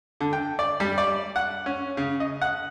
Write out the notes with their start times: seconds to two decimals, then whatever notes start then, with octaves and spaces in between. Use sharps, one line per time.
0.21 D3
0.33 G5
0.59 D5
0.80 G3
0.98 D5
1.36 F#5
1.66 C#4
1.97 C#3
2.20 D#5
2.42 F#5